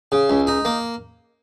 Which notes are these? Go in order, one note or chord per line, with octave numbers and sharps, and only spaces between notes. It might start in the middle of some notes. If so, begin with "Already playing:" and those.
C#3
C#2
D#4
A#3